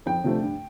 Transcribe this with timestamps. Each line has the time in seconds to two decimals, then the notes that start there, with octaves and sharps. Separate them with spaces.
0.06 F2 G5
0.24 C3 F3 A3 D4
0.42 G2